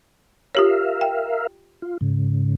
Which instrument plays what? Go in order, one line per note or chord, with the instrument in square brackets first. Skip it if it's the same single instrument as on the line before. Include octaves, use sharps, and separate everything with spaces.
[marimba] F4 G4 C#5 [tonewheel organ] A#4 E5 F5
[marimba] G5
[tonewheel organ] F4
G#2 C#3